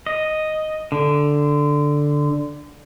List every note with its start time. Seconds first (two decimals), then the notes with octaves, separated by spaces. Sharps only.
0.06 D#5
0.92 D3